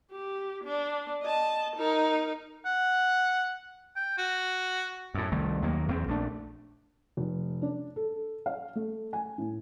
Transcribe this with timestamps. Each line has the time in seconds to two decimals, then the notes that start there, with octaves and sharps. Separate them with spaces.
0.12 G4
0.64 D4
1.23 D#5 A5
1.76 D#4 A#4
2.66 F#5
3.96 G5
4.18 F#4
5.14 F#2 A2
5.32 C2 D#3 A3
5.62 D#2 D#3 F#3 A#3
5.88 E2 C4
6.08 A#1 A3 D4
7.17 F1
7.62 D4
7.96 A4
8.46 F5
8.75 A3
9.13 G#5
9.38 A2